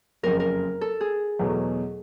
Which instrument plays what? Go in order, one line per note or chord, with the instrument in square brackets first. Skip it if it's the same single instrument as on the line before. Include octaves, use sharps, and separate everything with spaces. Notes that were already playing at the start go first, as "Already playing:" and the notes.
[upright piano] F#1 F2 C#3 F3 [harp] A#4
[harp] A#4
A4
G#4
[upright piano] E2 B2 F#3 A3